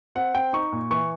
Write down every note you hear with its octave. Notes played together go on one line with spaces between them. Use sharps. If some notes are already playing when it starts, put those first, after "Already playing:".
C4 F#5
C4 G5
D#4 C#6
A#2
E3 C#6